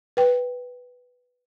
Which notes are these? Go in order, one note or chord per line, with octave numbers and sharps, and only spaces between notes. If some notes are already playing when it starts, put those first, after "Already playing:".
B4 G5